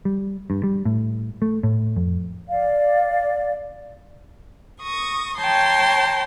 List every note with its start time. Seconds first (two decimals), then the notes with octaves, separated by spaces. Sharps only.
0.05 G3
0.50 G2
0.64 G3
0.85 A2
1.42 A3
1.63 A2
1.96 F2
2.49 D5 F5
4.81 C#6 D#6 A#6
5.37 C#5 G5 A5 A#5 C6